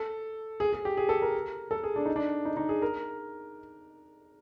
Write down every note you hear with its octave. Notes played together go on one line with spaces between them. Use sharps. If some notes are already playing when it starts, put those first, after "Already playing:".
Already playing: A4
G#4
G#4
G4
G#4
A4
A#4
A4
G#4
D4
D#4
D4
D#4
D#4
G#4
A#4